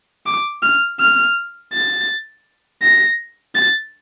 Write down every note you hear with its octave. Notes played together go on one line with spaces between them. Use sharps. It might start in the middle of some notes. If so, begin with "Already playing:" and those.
D6
F6
F6
A6
A#6
A6